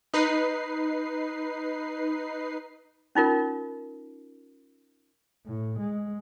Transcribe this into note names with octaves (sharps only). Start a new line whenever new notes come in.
D#4 B4 C7
C#4 D#4 F4 A#4
A2
G#3